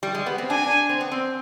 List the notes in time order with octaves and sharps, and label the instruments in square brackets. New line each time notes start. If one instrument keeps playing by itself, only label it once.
[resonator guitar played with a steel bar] G3
G#3
B3
C4
[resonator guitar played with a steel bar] D4 [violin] G#5
[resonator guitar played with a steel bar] C4
B3
C4